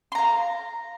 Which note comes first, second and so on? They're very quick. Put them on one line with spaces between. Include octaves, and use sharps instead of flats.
C6 A#5 F5